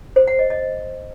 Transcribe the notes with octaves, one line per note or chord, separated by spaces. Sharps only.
C5
F#5
D#5
D#5